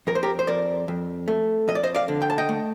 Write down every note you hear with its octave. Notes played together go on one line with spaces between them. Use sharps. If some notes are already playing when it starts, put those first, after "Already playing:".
F2 A#4
C5
G4 A#4
C5
F2 A#4 D5
F2
A3
F2 D#5
D5
C5 D#5
D5 F5
D3
G5
A5
D#5 G5
A3